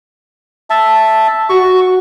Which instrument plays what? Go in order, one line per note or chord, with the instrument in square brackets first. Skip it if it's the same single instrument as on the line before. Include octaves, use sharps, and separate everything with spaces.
[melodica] E5 A5
[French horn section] F#4 [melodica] C#6